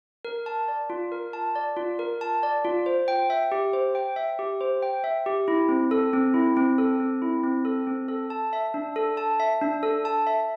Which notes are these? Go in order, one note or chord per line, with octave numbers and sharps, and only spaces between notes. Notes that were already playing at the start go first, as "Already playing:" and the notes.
A#4
A5
D5
F4
A#4
A5
D5
F4
A#4
A5
D5
F4
C5
G5
E5
G4
C5
G5
E5
G4
C5
G5
E5
G4
E4
C4
A4
C4
E4
C4
A4
C4
E4
C4
A4
C4
A4
A5
E5
D4
A4
A5
E5
D4
A4
A5
E5